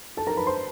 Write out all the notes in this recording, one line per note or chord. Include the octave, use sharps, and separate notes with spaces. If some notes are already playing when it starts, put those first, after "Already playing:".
A4 A5
A#4 A#5
B4 B5
C5 C6